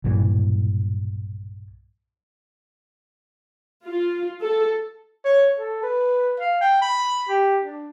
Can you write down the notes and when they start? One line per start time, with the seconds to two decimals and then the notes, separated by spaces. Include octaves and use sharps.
0.04 B1 G2 A#2 E3
3.86 F4
4.42 A4
5.25 C#5
5.59 A4
5.83 B4
6.40 F5
6.61 G5
6.82 B5
7.29 G4
7.64 D4